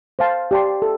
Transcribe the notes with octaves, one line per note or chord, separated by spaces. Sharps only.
C5 F5 A5
G4 D5 A5 C6
A4